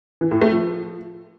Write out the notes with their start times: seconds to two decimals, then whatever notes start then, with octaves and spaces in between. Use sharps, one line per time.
0.21 E3
0.31 A2
0.41 A3
0.52 F3